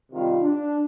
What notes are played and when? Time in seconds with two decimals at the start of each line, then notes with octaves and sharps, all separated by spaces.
0.11 C3 D#3 G3 F4
0.43 D4